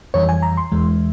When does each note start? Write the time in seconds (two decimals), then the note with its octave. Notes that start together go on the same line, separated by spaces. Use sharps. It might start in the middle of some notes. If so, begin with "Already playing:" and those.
0.14 F2 E3 G3 C#5
0.29 G#5
0.42 A#5
0.57 C6
0.72 E2 E3 G#3